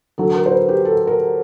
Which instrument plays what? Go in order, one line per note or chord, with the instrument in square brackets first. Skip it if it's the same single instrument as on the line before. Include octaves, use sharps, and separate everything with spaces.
[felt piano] D3 F#3 A4
A#4
C5
B4
G4
A4
A#4